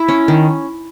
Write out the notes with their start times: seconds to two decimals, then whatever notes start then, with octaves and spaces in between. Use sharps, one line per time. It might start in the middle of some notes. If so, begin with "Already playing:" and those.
Already playing: E4
0.08 C#4
0.28 D#3